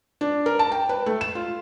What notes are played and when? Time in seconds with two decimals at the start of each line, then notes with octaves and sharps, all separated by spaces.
0.21 D4
0.46 A#4
0.59 A5
0.72 G5
0.89 B4
1.06 A3
1.21 E7
1.35 F4